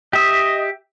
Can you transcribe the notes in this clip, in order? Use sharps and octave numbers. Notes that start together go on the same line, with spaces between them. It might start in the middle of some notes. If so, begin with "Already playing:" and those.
G4 D#5 E5